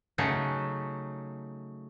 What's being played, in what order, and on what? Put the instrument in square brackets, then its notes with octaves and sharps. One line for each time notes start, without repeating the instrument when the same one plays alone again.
[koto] C#3 F#3 A3 C#4 D#4 A5